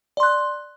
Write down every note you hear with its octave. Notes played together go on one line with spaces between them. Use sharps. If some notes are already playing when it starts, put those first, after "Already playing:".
D5 C6 F#6